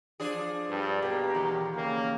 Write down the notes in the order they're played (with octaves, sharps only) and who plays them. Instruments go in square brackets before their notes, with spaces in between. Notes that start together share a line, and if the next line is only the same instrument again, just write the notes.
[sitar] F3 D4 G#4
[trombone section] G2
[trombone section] B2 G4 [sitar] A#3
[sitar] E2 D#3
[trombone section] C#3 A#3